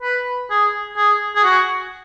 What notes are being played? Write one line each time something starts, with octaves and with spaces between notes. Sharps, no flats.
B4
G#4
G#4
G#4
F#4